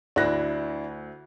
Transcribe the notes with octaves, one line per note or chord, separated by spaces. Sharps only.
D2 D4 E4 F#6 A#6